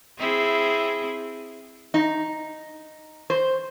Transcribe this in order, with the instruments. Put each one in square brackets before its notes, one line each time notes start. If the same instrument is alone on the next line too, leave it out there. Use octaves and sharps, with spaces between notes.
[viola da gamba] C4 E4 G#4
[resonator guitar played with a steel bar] D#4
C5